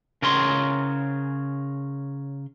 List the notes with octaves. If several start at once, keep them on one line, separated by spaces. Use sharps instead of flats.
C#3 A#4 C#5 C6